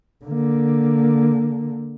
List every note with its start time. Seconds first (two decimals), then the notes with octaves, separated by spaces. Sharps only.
0.25 D3 A#3